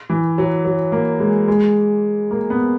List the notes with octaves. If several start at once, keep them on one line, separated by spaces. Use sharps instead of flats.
E3
F#3
F#3
A#3
G#3
G#3
A#3
B3